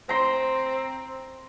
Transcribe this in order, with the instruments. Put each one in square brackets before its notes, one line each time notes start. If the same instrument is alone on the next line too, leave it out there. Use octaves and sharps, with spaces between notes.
[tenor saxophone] C4 [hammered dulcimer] A#5 C6